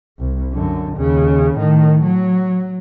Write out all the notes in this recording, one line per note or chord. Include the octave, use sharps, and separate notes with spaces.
C2
F#2 D3
D#2 C#3
A2 D#3
F#3